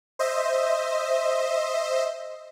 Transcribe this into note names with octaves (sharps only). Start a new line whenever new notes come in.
C5 D#5 E5